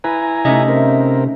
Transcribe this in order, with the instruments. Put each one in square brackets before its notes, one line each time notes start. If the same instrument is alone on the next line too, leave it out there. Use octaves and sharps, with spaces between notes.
[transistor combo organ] E4 G#5 A#5 [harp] B4
[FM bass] C3 [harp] A3 C#4 D#4 [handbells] D#5 E5
[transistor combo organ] C4 A#4